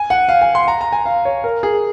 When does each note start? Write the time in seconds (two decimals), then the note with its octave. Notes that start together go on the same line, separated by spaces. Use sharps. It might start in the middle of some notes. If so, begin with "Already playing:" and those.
Already playing: G#5
0.10 F#5
0.29 F5
0.41 G#5
0.55 C6
0.68 A#5
0.81 A#5
0.92 G#5
1.06 F5
1.25 C#5
1.44 A#4
1.63 G#4